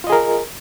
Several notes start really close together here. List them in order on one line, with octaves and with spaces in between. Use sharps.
F4 D#5 G#4 A#4